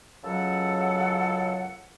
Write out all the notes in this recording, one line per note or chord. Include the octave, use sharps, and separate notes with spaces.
C#2 F#2 C#3 F#3 A4 F#5